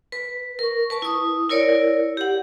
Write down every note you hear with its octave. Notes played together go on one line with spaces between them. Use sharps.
B4
A#4 C#6
B4 A5 C#6
E4 D#6
E4 A#4 C#5 D5
G4 F#5